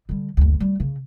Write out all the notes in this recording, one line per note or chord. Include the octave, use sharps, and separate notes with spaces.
D3 G3
F#1 D2
G3
C#3